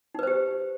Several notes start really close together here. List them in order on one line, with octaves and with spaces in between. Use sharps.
D#4 B4 C5 G4